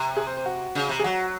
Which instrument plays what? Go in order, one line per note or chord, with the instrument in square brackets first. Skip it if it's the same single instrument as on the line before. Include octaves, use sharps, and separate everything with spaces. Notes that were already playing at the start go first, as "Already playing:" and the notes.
Already playing: [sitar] C3
[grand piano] G#4
C5
C5
F#4
[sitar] C#3
C3
[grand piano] G#4
[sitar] F#3 [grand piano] F#4